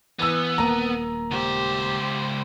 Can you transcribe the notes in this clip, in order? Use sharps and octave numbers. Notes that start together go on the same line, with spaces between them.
E3 B3 E6
D#1 A#3 A#5
C#2 G4 C5